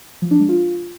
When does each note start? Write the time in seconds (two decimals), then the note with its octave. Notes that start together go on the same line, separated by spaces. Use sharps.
0.22 F3
0.31 D4
0.40 G#3
0.49 F4